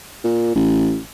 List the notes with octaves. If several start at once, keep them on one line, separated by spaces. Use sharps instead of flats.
A#2
A1